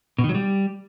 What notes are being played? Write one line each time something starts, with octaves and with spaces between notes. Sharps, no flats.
B2
D#3
F#3
G3